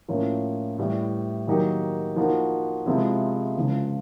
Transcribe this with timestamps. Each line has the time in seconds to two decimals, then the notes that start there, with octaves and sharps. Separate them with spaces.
0.09 A2 F3 A#3 C#4
0.78 A2 E3 G3
1.47 D#3 F#3 A#3 D#4 G4
2.16 F3 A#3 D#4 F#4
2.86 C3 F3 G#3 C4 E4
3.56 C#2 C#3 F3